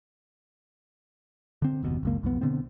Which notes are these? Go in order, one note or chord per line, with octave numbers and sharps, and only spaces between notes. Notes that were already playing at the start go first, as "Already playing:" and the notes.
D3 C4
F#1 D#2 B2
F#1 C#2 A#3
B1 F2 B3
B2 D3 B3 C4